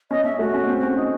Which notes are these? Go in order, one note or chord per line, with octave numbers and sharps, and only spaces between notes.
C#4 D#5
C#4 E5
A3 F#4
C#4
C4
C#4
D#4